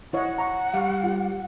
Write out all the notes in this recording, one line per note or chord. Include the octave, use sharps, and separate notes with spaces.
E4 C#5 D#5 F#5
A#5 C#6
G3 F5 C#6
F4 G4